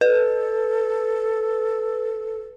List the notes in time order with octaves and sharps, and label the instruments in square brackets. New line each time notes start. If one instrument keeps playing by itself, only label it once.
[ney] A4 [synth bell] B4